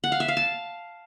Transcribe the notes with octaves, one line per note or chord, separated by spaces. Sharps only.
F#5
F5
E5
F5
A5